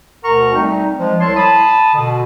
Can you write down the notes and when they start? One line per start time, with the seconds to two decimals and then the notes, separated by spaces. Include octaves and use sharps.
0.24 D2 B2 A#4 F#5 A#5 C#6
0.53 G3 A3 C4 D#4
0.99 F3 G#3
1.20 C2 E4 C#5 A5 C6
1.37 A5 B5 D#6
1.93 B2 D3